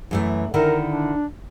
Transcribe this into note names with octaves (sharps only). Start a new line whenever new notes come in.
F#2 E3 A3
D3 D#3 E4 A#4
D4